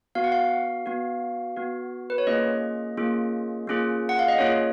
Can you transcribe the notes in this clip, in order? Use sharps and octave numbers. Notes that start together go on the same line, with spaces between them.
B3 F#4 F5
F#5
F5
B3 F#4
B3 F#4
B4
C#5
A#3 C#4 F4 G#4 D#5
A#3 C#4 F4 G#4
A#3 C#4 F4 G#4
F#5
F5
D#5
A#3 C#4 F4 G#4 C#5